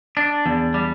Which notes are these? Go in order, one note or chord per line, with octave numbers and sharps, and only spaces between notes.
D4
E2
G3